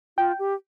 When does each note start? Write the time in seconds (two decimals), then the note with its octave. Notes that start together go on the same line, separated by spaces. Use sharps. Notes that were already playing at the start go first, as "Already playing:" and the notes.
0.17 F4 G5
0.39 G4